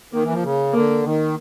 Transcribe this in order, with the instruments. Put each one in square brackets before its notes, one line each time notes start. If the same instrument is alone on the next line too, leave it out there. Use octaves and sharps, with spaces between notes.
[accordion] D#3 [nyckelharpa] A#3
[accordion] E3
F3
C#3
[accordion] D3 [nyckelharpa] A#3
[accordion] D#3